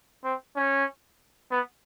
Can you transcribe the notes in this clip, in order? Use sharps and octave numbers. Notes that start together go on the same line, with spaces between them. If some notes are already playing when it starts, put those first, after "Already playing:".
C4
C#4
B3